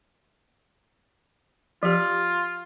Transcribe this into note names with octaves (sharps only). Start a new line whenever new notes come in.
F3 F4 G4